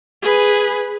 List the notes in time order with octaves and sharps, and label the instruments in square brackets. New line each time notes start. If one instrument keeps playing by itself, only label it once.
[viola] G#4 B4